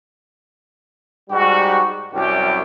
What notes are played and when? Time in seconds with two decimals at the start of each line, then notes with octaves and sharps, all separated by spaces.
1.30 G#2 G3 F#4
2.12 C2 F#2 G4